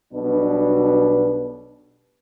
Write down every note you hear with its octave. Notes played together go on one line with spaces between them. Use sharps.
B1 B2 G3 D4 B4